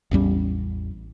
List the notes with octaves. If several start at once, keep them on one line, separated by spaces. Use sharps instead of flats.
A1 E2 G3 C#4